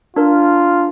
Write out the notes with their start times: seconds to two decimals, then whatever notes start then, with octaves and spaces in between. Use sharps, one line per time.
0.16 D4 F4 A#4